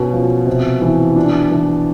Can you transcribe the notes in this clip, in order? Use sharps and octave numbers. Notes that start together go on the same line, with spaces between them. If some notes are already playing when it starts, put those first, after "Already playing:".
Already playing: B2 C#4
F3
C3
E3
D4
E3